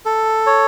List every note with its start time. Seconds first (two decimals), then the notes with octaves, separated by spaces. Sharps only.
0.05 A4
0.46 C#5